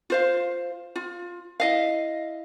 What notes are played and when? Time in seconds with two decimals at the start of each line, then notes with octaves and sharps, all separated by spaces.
0.10 F4 C5 F5
0.96 F4
1.60 E4 D#5 F5